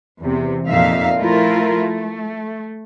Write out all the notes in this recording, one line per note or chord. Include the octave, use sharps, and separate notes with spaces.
E2 C3
F2 A#2 D#4 E5 F5
F3 A3 E4 F4 A#4
A3